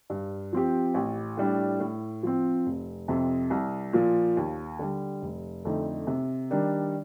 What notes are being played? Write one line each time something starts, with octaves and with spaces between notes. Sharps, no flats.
G2
F3 C4 G4
A1
A2 G3 D4
A2
F3 C4
F1
F2 C3
C2
A#2 F3
D#2
D3 G3
F1
F2 D3 A3 D#4
C3
D#3 G3 D4